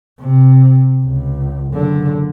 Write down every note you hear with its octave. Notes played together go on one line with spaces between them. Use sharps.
C3
C#2
F#1 D3